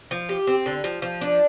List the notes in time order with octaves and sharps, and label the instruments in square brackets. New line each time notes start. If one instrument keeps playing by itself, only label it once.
[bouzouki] F3
G4
C4
D3
F3
F3
D4